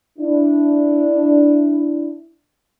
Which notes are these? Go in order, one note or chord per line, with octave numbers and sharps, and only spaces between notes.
D4 E4